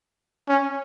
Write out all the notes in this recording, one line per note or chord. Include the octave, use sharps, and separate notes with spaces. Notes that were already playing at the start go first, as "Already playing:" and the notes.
C#4